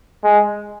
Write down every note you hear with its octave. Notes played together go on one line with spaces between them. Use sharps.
G#3